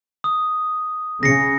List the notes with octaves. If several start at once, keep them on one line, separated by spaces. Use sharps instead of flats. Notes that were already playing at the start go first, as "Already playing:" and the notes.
D#6
C#3 A#6 C7 C#7